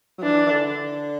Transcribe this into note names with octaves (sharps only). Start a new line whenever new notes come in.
F#3
E3 D4
E3
D3